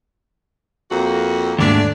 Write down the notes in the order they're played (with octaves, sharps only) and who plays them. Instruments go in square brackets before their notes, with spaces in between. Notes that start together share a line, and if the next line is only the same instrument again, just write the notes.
[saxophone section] F2 A#3 F#4
[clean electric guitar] D#2 G#2 A3 [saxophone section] D4 D5